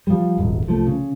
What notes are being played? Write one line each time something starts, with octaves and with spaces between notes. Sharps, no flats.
F3 G3
D#1 G#1
C2 F3 A3
C#3